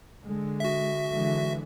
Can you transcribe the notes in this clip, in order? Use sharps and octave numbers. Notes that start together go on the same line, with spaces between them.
D3 G#3
F#4 E5
D3 E3 G#3